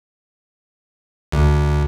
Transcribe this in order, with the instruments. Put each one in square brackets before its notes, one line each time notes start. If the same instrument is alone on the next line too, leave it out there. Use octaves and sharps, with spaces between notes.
[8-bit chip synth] D2